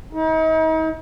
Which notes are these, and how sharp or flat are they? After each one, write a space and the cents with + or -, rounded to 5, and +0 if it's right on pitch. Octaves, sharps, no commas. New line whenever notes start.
D#4 +40